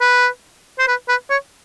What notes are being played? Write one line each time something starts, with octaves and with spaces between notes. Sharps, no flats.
B4
C5
B4
B4
C#5